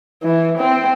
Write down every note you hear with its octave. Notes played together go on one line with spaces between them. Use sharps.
E3
C4